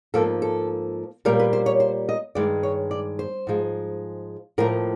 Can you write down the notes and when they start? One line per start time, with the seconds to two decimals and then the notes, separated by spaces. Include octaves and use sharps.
0.14 G#2 F3 A#3 A4
0.42 A4
1.25 A#2 G3 A#3 A#4
1.39 B4
1.53 C5
1.66 C#5
1.80 C5
2.09 D#5
2.35 G2 D#3 G#3 D5
2.63 C#5
2.91 D5
3.19 C5
3.47 G#2 F3 G#3
4.58 A2 F3 A#3 A#4